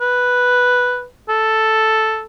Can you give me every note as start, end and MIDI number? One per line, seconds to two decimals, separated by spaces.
0.01 1.06 71
1.29 2.25 69